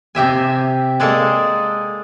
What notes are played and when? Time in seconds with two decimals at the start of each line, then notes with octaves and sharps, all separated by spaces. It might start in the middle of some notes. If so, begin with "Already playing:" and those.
0.15 C3 G4 E5 G#5
1.00 G#3 A#3 G#4 A4 D5